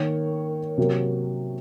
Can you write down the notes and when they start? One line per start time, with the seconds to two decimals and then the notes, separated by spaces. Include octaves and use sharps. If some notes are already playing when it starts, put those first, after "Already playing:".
Already playing: D#3 A#3 C#5
0.78 C3 F#3 A#3